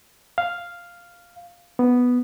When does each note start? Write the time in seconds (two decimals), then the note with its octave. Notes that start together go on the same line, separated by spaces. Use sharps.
0.38 F5
1.79 B3